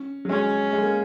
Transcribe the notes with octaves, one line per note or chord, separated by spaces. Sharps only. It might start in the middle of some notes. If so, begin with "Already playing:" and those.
Already playing: C#4
F#3
G#3 C#4
G#3
A#3